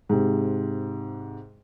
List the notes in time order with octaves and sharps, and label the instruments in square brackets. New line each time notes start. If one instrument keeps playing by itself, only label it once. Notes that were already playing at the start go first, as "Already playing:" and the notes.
[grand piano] G#2 C3